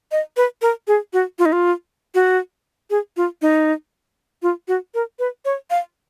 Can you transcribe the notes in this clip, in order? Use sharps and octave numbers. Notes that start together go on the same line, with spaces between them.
D#5
B4
A#4
G#4
F#4
F4
D#4
F4
F#4
G#4
F4
D#4
F4
F#4
A#4
B4
C#5
F5